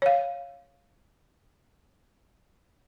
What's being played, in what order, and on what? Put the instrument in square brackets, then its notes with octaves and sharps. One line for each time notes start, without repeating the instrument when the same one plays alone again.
[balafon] C#5 F5